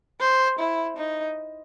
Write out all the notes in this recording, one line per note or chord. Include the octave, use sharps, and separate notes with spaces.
C5
E4
D#4